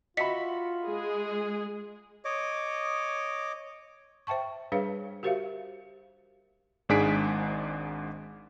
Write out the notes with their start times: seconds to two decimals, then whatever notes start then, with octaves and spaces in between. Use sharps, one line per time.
0.17 F4 F#4 D#5 E5 B5 B6 C#7
0.87 G#3 G#4
2.25 C#5 D#5 D6
4.27 C5 E5 G5 A5 C#6
4.72 G3 D4 G#4 B4 C#5 F5
5.23 F#4 G4 A#4 C5 E5 F5
6.89 G#1 G#2 D4 G#4 B6 D7